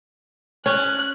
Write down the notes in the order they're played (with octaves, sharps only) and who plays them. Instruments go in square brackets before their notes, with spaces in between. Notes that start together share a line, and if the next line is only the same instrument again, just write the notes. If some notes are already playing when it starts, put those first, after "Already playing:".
[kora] C#4 [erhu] F#6